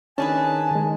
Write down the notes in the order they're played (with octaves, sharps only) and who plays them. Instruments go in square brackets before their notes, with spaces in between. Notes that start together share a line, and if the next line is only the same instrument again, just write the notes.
[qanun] D#3 G#4 B4 [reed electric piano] C#4 D4 [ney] G#5 [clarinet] A5
[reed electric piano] D#3 G#3